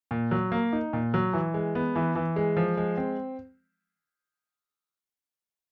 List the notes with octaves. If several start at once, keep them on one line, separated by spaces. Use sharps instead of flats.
A#2
F#3
A#3
D#4
A#2
F#3
E3
G#3
B3
E3
E3
G#3
F3
G#3
C4